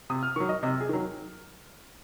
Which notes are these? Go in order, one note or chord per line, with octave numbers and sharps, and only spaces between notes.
C3 D#6
F6
D#3 F#3 C#6
D#5
C3 D#5
G#4
D#3 F#3